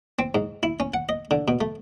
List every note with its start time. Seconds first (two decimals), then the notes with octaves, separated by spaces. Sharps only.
0.19 C4
0.35 G#2
0.63 E4
0.80 C#4
0.94 F#5
1.09 D#5
1.31 D3
1.48 B2
1.61 A3